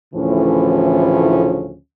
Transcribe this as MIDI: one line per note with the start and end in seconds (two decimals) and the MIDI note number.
0.15 1.75 38
0.15 1.75 45
0.15 1.75 49
0.15 1.75 52
0.15 1.75 53
0.15 1.75 61